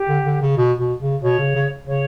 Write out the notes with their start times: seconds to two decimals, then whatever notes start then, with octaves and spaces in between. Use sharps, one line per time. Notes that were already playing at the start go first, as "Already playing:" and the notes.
Already playing: G4
0.09 D3
0.26 D3
0.41 C#3
0.57 B2
0.79 B2
1.01 C#3
1.22 B2 C#5
1.39 C#3
1.55 C#3
1.87 C#3 C#5